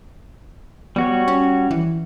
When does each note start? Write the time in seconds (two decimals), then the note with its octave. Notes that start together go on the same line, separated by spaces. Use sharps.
0.96 G3 B3 F#4 C#5
1.28 C#4
1.71 E3